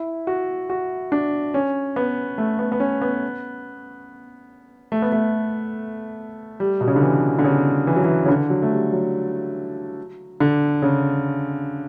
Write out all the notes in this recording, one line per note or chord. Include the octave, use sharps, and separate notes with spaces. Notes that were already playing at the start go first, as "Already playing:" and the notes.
Already playing: E4
F#4
F#4
D4
C#4
B3
A3
B3
B3
C#4
B3
A3
B3
A3
G3
B2
C#3
D3
E3
D3
C#3
E3
F#3
E3
C#3
D3
F#3
A3
G3
F#3
D3
C#3